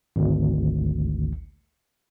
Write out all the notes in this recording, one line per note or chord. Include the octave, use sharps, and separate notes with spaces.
G#1 D2